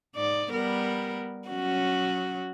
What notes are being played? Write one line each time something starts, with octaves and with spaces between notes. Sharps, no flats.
G#2 D#4 D5
G3 B3 A#4
F#3 C#4 F#4